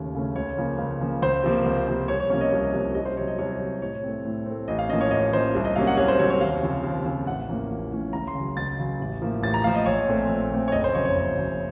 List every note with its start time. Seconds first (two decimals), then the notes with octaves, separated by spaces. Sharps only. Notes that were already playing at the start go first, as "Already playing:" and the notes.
Already playing: D#2 C#3 A3 C#4
0.15 C#3 A3 C#4
0.36 C#2 C#5
0.57 C#3 F3 A#3
0.79 C#2
1.00 C#3 F3 A#3
1.22 C#2 C5
1.43 C3 F3 A#3
1.66 C#2
1.88 C3 F3 A#3
2.08 C2 C#5
2.20 C#5
2.30 C3 F3 A#3 C#4 C#5
2.41 D#5
2.52 C2
2.73 C3 F3 A#3 C#4
2.95 C2 D#5
3.06 C5
3.16 C3 C#5
3.21 F#3
3.28 D#5
3.38 C2 C#5
3.60 C3 F#3
3.82 A2 C#5
4.04 A3 C4
4.25 A2
4.46 A3 C4
4.68 A1 D#5
4.79 F5
4.89 A2 F3 A#3 C#4 D#5
5.01 C#5
5.11 A1 D#5
5.32 A2 F3 A#3 C#4 C5
5.55 C2
5.65 D#5
5.76 C3 F#3 A#3 C#4 F5
5.87 F#5
5.97 C2 C#5
6.08 C5
6.19 C3 F#3 A#3 C#4 C#5
6.30 C#5
6.40 D#2 F5
6.62 C#3 F3 C4
6.84 D#2
7.05 C#3 F3 C4
7.27 A1 F#5
7.48 A2 F3 A#3 C#4
7.70 A1
7.92 A2 F3 A#3 C#4
8.13 C#2 A#5
8.28 C6
8.35 C#3
8.40 F#3
8.57 C#2 A6
8.79 C#3 F#3
9.00 A1
9.22 A2 F3 A#3
9.43 A1 A6
9.54 A#5
9.64 A2 F3 A#3 F5
9.75 D#5
9.86 A#1 C#5
10.08 A#2 A3 C4
10.29 A#1
10.51 A#2 A3 C4
10.68 C#5
10.72 F#1 D#5
10.84 C5
10.94 F2 C#3 F#3 C#5
11.05 C#5
11.15 F#1
11.37 F2 C#3 F#3